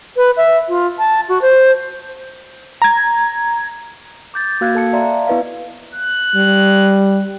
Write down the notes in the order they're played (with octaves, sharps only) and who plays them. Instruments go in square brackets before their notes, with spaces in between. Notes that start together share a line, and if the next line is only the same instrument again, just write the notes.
[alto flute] B4
E5
F4
A5
F#4
C5
[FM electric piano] A#5 G#6
[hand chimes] D6 G6 A6
A#3 F#4 F5 E6 F#6 G#6
A4 A5 C#7
D5 E5 F5 A5 A#5 C6
B3 E4 B4 D#5 F5
[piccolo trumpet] F#6
[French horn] G3